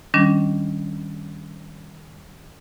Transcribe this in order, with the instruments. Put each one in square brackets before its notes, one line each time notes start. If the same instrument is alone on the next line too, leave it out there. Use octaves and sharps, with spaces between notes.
[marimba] D#3 G3 C#4 D4